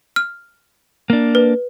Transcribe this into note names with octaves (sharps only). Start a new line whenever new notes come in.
F6
A#3 D4
B4